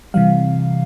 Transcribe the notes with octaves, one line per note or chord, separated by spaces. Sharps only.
C3 E3 G3 F5